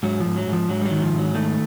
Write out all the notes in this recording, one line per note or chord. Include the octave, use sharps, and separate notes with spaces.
G#2 F#3
F3
G#2
F#3
G#2 F3
G#2 F#3
G3
F#3
D#3
F3
G#2
F#3
D#3 A3